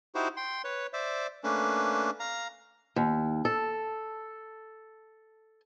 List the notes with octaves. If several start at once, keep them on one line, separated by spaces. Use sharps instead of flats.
D#4 E4 F#4 G4 C5
G5 C6
B4 C#5
C5 D5 E5
A3 A#3 C#4 D4 B4
F5 A#5
D#2
A4